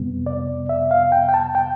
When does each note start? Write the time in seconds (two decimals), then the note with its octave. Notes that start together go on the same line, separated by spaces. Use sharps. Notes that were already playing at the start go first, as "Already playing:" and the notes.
Already playing: F2 C3 G3 B3
0.26 D5
0.69 E5
0.91 F5
1.12 G5
1.29 G5
1.34 A5
1.55 G5